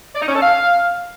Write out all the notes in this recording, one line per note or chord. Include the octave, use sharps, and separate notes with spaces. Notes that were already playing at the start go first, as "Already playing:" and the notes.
D5
D#4
C#4
A4
F5